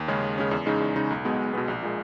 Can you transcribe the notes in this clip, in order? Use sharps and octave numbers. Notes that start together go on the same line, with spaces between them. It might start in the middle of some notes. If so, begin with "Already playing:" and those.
Already playing: D#2
C#3 G#3 C#4
D#2
C#3 G#3 C#4
E2
C#3 G#3 D#4
E2
C#3 G#3 D#4
B1
B2 G#3 B3
B1
B2 G#3 B3
A#1
A#2 G#3